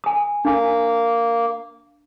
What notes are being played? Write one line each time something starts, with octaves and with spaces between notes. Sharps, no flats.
G#5 D#6
A#3 D4